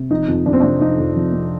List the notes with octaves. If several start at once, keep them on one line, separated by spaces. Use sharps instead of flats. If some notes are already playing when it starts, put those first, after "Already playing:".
Already playing: C3
F3 D#4
F2
F2 D4
C4
D4
C3
F3 D#4
F2
F2
C3